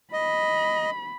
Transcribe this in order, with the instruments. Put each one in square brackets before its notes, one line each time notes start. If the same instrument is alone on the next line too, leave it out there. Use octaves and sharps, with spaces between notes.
[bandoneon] D#5 [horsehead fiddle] B5